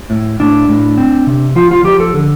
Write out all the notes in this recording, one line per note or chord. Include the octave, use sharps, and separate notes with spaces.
A2
A2 D4
A2
C4
C3
F3 F4
F4
F3 G4
A4
D3